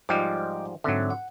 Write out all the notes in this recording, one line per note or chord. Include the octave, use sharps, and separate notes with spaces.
G#2 F3 G3 D#5 G5 D6
G#2 D3 F#3 C4 E5
F#5